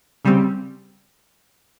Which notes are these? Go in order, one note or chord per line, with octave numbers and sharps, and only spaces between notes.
C#3 G3 C4